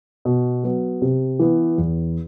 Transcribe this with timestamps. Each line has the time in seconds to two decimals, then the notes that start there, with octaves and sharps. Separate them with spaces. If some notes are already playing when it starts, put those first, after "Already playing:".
0.25 B2
0.63 F#3 B3
1.02 C3
1.39 E3 B3
1.78 E2